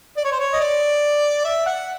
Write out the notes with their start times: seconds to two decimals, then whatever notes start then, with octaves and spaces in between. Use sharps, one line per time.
0.17 D5
0.25 C#5
0.32 C5
0.40 C#5
0.53 D#5
0.60 D5
1.45 E5
1.66 F#5